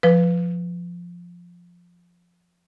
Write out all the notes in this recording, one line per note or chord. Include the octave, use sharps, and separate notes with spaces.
F3 B4